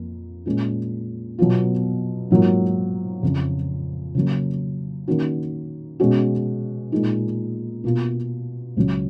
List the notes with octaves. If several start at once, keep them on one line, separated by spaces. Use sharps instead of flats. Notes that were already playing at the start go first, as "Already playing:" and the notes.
Already playing: F2 A#3
A#2 G#3 C#4
B2 F#3 B3 F4
G#2 F#3 A#3 F4
F2 C#3 F3
C#3 F#3 A#3
D#3 A#3 C#4 F#4
B2 G#3 C#4 F#4
A#2 G#3 D#4
B2 A#3 F4
C#2 C#3 F#3